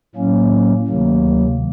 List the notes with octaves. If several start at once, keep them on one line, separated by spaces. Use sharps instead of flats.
A2 F#3 A#3 C#4
D2 C3 D#3 F#3 A#3